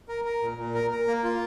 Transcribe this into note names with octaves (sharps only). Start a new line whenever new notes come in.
A#4
A#4
A#2
A#2
A#4
A#4
A#3
F4